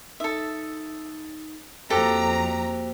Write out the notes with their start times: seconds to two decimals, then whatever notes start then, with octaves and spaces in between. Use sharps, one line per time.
0.20 D#4 A4 E5
1.90 F2 A#3 F#4 G4 A4 C5 A#5